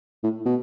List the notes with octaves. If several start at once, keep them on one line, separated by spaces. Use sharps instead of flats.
A2
B2